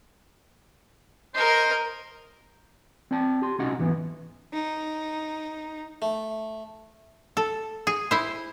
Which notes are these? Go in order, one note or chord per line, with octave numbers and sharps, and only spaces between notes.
A#4 C5 D#5
C4 D5 G5 A5
G4 C6
C2 C#4 D#4 F#4 D#5 F#5
E2 G#2 E3 B3 D#4
D#4
A3
A4
G#4
E4 C5